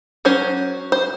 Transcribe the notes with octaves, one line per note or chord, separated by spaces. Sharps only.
F#3 C#4 C5
C5